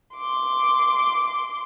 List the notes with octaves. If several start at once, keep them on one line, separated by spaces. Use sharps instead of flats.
C6 D6